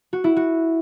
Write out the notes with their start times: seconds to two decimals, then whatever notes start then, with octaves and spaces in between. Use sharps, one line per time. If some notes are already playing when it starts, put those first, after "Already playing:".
0.13 F#4
0.24 E4
0.36 F#4